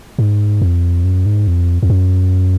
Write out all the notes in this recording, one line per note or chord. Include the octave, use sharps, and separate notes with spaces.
G#2
F2
F#2
G#2
F2
F2
F#2